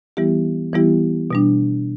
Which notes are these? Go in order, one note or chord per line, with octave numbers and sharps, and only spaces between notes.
E3 G3 B3 E4 G4
E3 G3 B3 E4 G4
B2 G3 D4